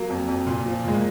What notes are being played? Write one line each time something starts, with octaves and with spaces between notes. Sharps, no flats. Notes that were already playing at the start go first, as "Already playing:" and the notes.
Already playing: F#3 A#3
F2
F2
A#2
F3
A#2 G#3
A#3